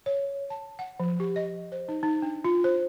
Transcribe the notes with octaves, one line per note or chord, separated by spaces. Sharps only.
C#5
A5
F#5
F3
G4
D#5
C5
D#4
D#4
D4
F4
C5